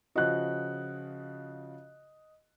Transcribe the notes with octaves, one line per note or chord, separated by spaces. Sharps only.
C#3 F3 F#4 D#5 F#6